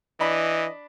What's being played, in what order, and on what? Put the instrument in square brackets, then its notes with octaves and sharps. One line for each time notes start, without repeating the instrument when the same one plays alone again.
[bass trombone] E3 [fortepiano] D4 B5 [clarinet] D#5